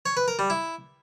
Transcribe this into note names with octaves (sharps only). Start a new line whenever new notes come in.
C#5
B4
A#4
G3
E4